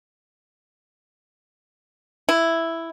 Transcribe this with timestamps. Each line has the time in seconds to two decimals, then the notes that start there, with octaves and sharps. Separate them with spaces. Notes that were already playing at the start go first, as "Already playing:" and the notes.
2.29 E4